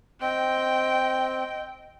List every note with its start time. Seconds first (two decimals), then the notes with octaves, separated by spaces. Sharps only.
0.21 C4 D#5 G5